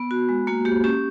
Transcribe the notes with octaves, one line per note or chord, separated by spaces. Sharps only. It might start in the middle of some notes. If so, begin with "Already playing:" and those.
Already playing: B3
F#4
G#3
A#3 F#4
A#3 G4
C#4 G4